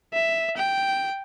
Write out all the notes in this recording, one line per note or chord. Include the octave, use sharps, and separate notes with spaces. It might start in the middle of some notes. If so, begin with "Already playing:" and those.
E5
G5